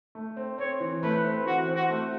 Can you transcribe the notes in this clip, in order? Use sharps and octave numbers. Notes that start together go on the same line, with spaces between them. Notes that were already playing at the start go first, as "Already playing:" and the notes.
A3
C4
C4 C#5
E3
A3 B4
C4
E3 F#4
C4
F#4
A3